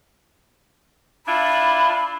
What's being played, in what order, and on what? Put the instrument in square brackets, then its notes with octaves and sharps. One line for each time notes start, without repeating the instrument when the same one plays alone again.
[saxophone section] D4 E4 F4 [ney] B5